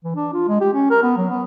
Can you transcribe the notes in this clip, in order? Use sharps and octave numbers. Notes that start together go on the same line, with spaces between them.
E3
D4
F4
G#3
G4
C#4
A#4
B3
F#3
B3